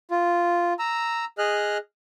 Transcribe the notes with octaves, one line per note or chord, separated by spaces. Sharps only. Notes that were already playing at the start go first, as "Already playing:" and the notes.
F4
A#5 E6
G#4 D#5 F6 F#6